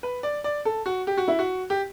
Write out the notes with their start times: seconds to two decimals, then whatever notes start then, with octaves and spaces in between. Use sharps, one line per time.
0.03 B4
0.23 D5
0.44 D5
0.65 A4
0.86 F#4
1.07 G4
1.17 F#4
1.28 E4
1.39 F#4
1.70 G4